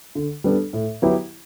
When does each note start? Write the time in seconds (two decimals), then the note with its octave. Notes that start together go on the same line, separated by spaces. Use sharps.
0.15 D3
0.44 G3 B3 D4 A4
0.73 A2
1.02 F#3 B3 E4 G4